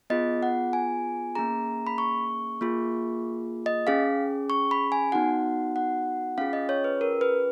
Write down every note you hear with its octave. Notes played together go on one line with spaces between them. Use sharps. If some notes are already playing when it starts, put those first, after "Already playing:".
B3 F4 G#4 D#5
F#5
G#5
A#3 C#4 G#4 A#5
B5
C#6
A#3 F4 G#4
D#5
C#4 G#4 F5
C#6
B5
G#5
B3 D#4 F#4 F#5
F#5
C#4 F4 G#4 F5
D#5
C#5
B4
A#4
B4